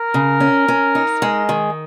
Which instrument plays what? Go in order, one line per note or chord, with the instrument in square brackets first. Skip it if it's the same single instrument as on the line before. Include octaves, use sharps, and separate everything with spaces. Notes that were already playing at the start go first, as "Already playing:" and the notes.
Already playing: [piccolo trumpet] A#4
[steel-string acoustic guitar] C#3
C#4
C#4
D#4
G#3
D#3